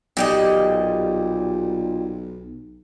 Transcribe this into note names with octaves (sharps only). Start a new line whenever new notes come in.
B1 A#2 G3 D#5